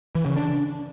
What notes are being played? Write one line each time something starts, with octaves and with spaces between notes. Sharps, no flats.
E3
C#3
D4